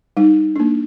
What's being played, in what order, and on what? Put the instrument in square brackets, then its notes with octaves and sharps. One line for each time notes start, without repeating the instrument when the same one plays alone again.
[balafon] G3 D#4
A#3 D4